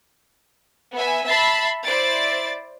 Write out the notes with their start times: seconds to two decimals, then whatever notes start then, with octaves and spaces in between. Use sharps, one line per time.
0.94 B3 E5 G#5
1.25 E5 A5 B5 A6 C7
1.85 E4 C5 D5 A6 C7 D7